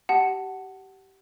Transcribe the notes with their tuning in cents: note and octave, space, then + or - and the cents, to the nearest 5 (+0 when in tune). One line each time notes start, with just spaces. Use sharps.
G4 -20 F#5 +15 A5 +0